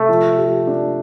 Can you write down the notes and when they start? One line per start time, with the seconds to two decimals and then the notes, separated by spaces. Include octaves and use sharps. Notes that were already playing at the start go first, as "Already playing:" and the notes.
Already playing: C3 A3
0.09 F3
0.38 G4
0.67 D4